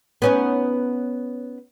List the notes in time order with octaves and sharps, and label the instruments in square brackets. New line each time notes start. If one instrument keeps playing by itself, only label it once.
[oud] B3 C#4 D#4